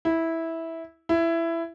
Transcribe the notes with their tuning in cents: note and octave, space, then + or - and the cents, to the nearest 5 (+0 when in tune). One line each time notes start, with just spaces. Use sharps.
E4 -10
E4 +15